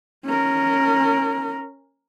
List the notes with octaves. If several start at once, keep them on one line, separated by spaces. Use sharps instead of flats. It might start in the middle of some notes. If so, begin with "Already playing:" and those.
C#4 A#4